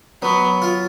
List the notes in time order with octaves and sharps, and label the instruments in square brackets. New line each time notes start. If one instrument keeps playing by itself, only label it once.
[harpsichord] F#3 [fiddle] B3
[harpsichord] F4